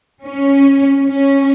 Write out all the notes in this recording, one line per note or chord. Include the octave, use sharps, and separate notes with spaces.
C#4
C#4